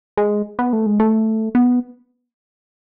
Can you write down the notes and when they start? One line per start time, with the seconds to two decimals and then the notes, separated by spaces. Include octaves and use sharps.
0.17 G#3
0.59 B3
0.73 A3
0.86 G#3
1.00 A3
1.55 B3